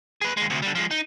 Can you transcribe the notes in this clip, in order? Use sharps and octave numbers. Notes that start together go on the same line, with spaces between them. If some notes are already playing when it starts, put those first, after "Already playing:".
G#4 B4
D#2 G#3
D2 C3
D3 G3
F3 G#3
D#4